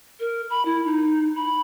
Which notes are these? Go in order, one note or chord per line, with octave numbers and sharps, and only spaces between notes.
A#4
B5
E4
D#4
B5